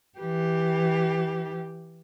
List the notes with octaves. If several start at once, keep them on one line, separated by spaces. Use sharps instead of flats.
E3 G4